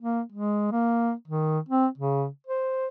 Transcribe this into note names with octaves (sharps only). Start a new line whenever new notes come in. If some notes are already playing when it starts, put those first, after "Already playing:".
A#3
G#3
A#3
D#3
C4
C#3
C5